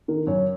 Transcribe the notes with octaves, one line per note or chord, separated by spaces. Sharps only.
D#3 A#4
F#2 C#5